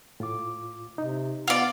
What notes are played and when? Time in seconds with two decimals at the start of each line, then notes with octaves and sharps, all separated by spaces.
0.20 A2 F4 D6
0.98 C3 D#4
1.48 B3 F4 D5